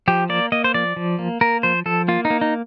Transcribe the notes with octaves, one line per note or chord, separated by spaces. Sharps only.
F3 G4
A#3 D5
A#3 D#5
C5
F3 D5
F3
A#3
A#3 A#4
F3 C5
F3 A4
A#3 F4
D#4
A#3
D#4